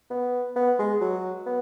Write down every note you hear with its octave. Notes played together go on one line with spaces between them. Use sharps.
B3
B3
G#3
F#3
B3